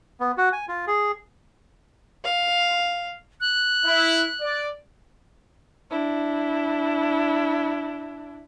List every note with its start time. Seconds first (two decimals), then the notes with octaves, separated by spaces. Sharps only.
0.20 B3
0.38 F#4
0.53 G#5
0.68 F4
0.87 G#4
2.24 F5
3.41 F#6
3.86 E4
4.41 D5
5.91 D4 E4